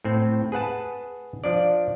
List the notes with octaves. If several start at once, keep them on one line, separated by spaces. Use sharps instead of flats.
A2 C4
G#4 B4 F#5 A5
F3 D4 D5